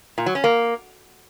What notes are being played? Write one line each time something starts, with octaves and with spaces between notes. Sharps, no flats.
A#2
F#3
C#4
A#3